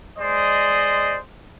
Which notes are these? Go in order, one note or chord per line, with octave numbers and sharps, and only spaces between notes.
G#3 C5 D5 D#5